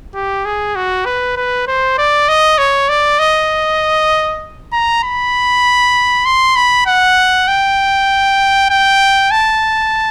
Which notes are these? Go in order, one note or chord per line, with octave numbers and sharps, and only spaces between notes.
G4
G#4
F#4
B4
B4
C5
D5
D#5
C#5
D5
D#5
A#5
B5
C6
B5
F#5
G5
G5
A5